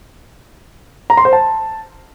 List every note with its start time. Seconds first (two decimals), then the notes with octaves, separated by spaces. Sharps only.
1.10 A#5
1.17 C6
1.25 C5
1.33 A5